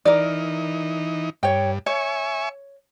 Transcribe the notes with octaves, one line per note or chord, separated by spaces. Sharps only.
E3 D#4 A#4 D5
G2 C#5 G5
C#5 E5 G#5 C#6